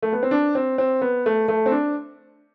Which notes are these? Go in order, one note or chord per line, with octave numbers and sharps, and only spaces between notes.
A3
B3
C4
D4
C4
C4
B3
A3
A3
C4
D4